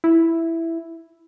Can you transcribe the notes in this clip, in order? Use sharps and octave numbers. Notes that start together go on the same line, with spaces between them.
E4